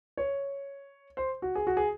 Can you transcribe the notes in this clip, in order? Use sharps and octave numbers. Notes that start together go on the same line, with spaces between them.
C#5
C5
F#4
G#4
F#4
G#4